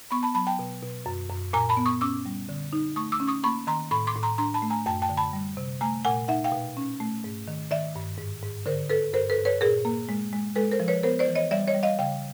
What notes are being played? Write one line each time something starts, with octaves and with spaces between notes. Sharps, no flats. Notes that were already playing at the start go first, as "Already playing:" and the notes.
B3 B5 C#6
A5 B5
F#3 A5 B5
G5 A5
B2
B2
F#2
F#2
A#2 G#5 A#5
A5 B5
B3
C#6 D#6
C#4 D6 E6
G3
D3
D#4
A3 C#6 D#6
D6 E6
C#4
C#6 D#6
A#3 B5 C#6
D#3 A#5 C6
A2 B5 C#6
C6 D6
A2
A#5 C6
D4 A#5 C6
A5 B5
A3
G#5 A#5
F#2 G5 A5
G5 A5
D3
A5 B5
G3
C3
A3 G#5 A#5
A#2 F#5 G#5
D#4 E5 F#5
F5 G5
B2
C#4
A3
G#2
D#3
D#3 D5 E5
G2
G#2
G#2
D3 A#4 C5
D3 A4 B4
G2 A#4 C5
A4 B4
G2
B4 C#5
A#2 G#4 A#4
A#3
G#3
G#3
G#3 A4 B4
A#4 C5
F3
B4 C#5
B3 A#4 C5
C5 D5
E3
C#5 D#5
G3 D5 E5
C#5 D#5
G3
D#5 F5
C#3 F5 G5